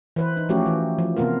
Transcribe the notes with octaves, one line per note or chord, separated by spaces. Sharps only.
E3 B4 C5
D#4
F3 A3 C#4 F#4 G4
E3
F3
C3 A#3 B3 F4 A#4